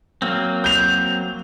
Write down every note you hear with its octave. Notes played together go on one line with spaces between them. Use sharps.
F#3 A#3 C4
G6 F7